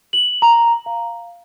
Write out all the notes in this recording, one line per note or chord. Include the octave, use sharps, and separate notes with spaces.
F#7
A#5
F5